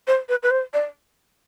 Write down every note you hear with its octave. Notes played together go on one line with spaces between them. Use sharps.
C5
B4
B4
C5
D5